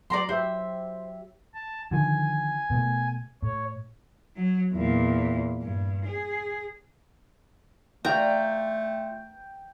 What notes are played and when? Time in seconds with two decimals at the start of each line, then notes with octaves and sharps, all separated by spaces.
0.10 F#3 D5 A#5 C6
0.29 G4 C5 E5
1.54 A5
1.91 D3 D#3 F3 G#5
2.70 B2 A3
3.42 A2 C#5
4.36 F#3
4.74 E2 A#2
5.62 G2
6.05 G#4
8.05 A3 F4 D5 G5 A#5